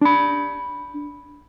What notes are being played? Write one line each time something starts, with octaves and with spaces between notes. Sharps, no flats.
D4 B5